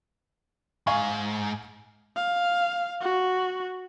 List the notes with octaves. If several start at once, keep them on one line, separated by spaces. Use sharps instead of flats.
G#2 F5 G#5 C#6
F5
F#4